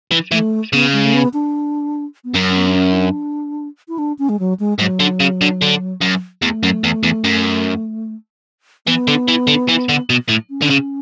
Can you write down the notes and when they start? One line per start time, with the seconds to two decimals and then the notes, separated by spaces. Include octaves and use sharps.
0.12 E3
0.31 E3 A3
0.73 C#3 B3
0.93 G#3
1.04 A3
1.14 B3
1.33 D4
2.24 B3
2.35 F#2 C#4
2.55 B3
2.68 D4
2.76 C#4
2.93 E4
2.96 D4
3.88 E4
3.98 D4
4.19 C#4
4.29 G#3
4.39 F#3
4.59 G#3
4.79 G#2 F#3
5.00 D3
5.20 C#3
5.41 D3
5.62 D3
6.02 F#2
6.42 E2 A3
6.63 F#2
6.84 E2
7.03 E2
7.24 F#2
8.86 E3 B3
9.08 D3
9.28 E3
9.47 D3
9.69 E3
9.89 D3
10.10 B2
10.29 A2
10.50 C#4
10.62 D3
10.70 C#3